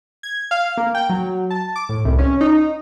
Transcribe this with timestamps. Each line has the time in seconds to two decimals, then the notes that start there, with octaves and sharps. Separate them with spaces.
0.23 G#6
0.51 F5
0.77 A#3
0.95 G5
1.09 F#3
1.50 A5
1.76 D6
1.89 A2
2.05 C2
2.19 C#4
2.41 D#4